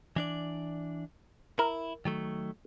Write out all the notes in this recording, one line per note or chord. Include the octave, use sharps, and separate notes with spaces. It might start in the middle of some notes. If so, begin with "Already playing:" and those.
E3 D4 D5
E4 A#4
D#3 F#3 A3